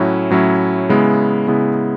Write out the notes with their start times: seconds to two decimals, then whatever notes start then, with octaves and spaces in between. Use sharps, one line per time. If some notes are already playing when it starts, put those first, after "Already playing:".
Already playing: A2 F#3 C#4 E4
0.30 A2 F#3 C#4 E4
0.89 C#3 G#3 B3 E4
1.48 C#3 G#3 B3 E4